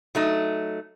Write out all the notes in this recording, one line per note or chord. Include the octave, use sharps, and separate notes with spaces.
F#3 A3 D#4